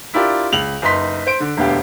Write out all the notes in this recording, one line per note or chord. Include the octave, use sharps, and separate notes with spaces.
D4 E4 F4 G4 A#4 D5
C#2 F7 F#7
F#1 D#4 B4 C6 B6
C5 D7
D3
E1 D2 D3 B3 G4 F5